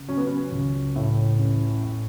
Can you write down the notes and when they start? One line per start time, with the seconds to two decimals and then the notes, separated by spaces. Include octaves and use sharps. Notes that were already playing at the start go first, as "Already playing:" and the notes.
Already playing: C#3
0.09 F#3 C#4
0.17 B3
0.27 C#4
0.52 C#2
0.96 A2
1.39 A1
1.83 A2